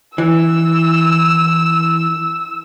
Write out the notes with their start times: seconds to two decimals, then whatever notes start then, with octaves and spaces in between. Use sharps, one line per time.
0.18 E3 E6